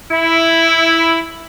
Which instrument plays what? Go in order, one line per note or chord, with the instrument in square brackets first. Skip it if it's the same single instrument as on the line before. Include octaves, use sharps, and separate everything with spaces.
[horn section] E4